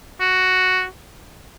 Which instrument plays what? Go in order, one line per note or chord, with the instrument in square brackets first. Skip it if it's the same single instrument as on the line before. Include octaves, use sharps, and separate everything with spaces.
[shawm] F#4